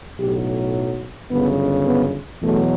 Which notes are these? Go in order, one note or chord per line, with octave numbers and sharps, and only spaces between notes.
B1 A2 F#3 G4
G1 F#2 C#3 B3
B3
E2 B2 F#3 A3